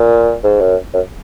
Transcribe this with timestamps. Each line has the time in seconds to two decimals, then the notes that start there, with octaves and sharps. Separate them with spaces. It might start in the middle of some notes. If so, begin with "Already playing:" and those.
Already playing: A#2
0.44 G#2
0.61 F#2
0.94 F#2